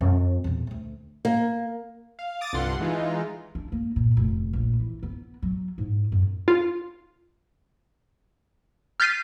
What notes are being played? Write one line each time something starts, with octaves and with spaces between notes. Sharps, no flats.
F2
E2 A#2
D2 A3
A#3
F5
D6 D#6 A6
C2 G2 D3 F4 F#5 C6
E3 G#3 D#4 F4
D4
A#3
A#2
F1
A#1
E3
B3
F#3
G#2
F#2
F4
F6 G6 A6 B6 C7 D#7